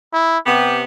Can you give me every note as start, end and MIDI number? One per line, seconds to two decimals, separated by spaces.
0.13 0.38 64
0.46 0.84 48
0.46 0.84 59
0.46 0.79 67